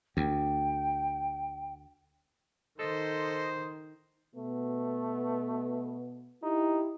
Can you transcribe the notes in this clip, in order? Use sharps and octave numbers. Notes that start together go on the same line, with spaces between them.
D2 G5
D#3 A4 C5 D#5
B2 A3 B3
D#4 E4 G4